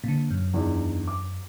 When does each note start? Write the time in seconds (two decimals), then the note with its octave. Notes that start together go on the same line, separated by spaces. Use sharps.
0.04 A#2 D3
0.31 F#2
0.54 E2 D4 D#4
1.08 D6